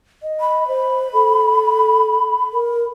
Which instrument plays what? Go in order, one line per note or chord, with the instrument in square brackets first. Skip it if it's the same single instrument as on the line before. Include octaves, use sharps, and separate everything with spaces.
[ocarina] D#5
[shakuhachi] B5
[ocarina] C5
A4
A#4